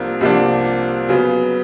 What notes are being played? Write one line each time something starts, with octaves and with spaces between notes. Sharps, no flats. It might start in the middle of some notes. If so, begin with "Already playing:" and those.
Already playing: C2 C3 F3 A#3 D4
C2 C3 F3 A#3 D4
C#3 F#3 B3